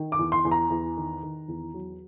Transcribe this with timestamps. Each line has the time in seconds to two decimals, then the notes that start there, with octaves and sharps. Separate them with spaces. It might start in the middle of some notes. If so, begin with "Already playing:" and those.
Already playing: D#3
0.12 D6
0.19 E2
0.32 C6
0.45 E2
0.51 A#5
0.70 E2
0.97 D#3
1.23 D#3
1.48 E2
1.74 F#3